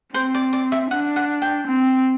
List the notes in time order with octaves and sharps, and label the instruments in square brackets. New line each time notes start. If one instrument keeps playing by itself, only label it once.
[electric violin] C4 [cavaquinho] C5
[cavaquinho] D5
D5
E5
[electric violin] D4 [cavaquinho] F#5
[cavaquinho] F#5
G5
[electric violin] C4